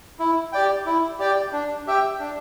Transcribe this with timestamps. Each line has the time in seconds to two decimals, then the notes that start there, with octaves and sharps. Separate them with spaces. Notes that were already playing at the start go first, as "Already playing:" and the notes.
0.20 E4
0.53 G4 D5 G5
0.86 E4
1.19 G4 D5 G5
1.53 D4
1.87 G4 E5 G5
2.20 D4